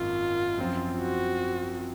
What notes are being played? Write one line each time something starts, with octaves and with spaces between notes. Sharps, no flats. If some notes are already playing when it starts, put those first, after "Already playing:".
Already playing: G#1 F#2 D#3 A#3 F4
F#2 F3 C4
F#4